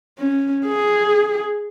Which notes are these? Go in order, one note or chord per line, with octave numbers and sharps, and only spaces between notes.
C#4
G#4